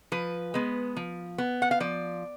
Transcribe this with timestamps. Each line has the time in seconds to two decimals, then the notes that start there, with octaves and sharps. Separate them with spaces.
0.12 F3 B4
0.54 G#3 B3
0.96 F3
1.38 B3
1.62 F#5
1.71 F5
1.80 F3 D5